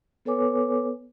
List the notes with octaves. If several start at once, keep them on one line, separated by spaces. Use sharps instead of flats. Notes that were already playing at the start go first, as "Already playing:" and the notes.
B3 A4 B4 C#5 G#5 D6